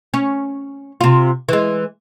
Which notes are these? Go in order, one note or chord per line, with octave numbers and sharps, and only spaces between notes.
C#4
C3 F4
E3 G#3